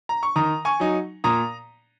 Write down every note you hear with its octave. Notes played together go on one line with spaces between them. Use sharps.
A#5
C#6
D#3 A#5 D#6
G#5 C#6
F#3 D#4
A#2 A#5 D#6